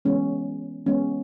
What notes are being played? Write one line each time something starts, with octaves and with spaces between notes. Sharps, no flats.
E3 G#3 B3 C#4
E3 G#3 B3 C#4